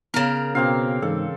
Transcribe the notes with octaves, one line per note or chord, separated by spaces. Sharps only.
C#3 B3 A#4
B2 A#3 C4 C#4 F5
G#2 E3 A4